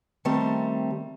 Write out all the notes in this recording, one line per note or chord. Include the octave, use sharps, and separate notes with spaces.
D#3 G3 A3 C4